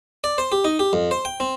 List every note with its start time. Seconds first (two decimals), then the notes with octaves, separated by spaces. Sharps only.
0.24 D5
0.38 C5
0.52 G4
0.65 D#4
0.79 G4
0.93 F2
1.11 C5
1.25 G5
1.40 C4